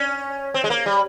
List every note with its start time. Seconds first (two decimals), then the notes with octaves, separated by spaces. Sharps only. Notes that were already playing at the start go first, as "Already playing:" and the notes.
Already playing: C#4
0.54 C4
0.64 G#3
0.70 A#3
0.86 G3